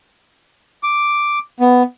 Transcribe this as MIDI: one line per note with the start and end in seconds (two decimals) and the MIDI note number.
0.83 1.39 86
1.60 1.83 59